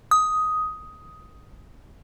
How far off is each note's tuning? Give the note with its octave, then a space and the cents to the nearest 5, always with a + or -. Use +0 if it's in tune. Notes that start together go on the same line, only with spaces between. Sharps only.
D#6 +10